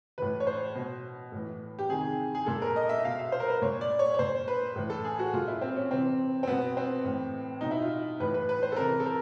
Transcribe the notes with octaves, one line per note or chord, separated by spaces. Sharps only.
A2 E3 B4
C#5
C5
B2
A2 E3
G4
C3 D#3 G#4
G#4
A#2 A4
A#4
D#5
E5
B2 F5
E5
C5
A#4
B4
A#2 C#5
D5
C#5
C#5
A#2 C5
B4
A2 E3
A4
G#4
F#4
A#2 F4
E4
C4
C#4
C3 E3 C4
C4
B2 B3
C4
A2 E3
B2 D#4
E4
F4
A2 E3 B4
B4
B4
C5
A4
C3 E3 A#4
A4
A#4